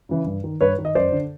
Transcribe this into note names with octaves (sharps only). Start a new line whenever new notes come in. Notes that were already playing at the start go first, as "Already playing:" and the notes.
C#3 E3
G2
D#3
G2 B4 C#5
D#3
D#5
F#2 C5 D5
D3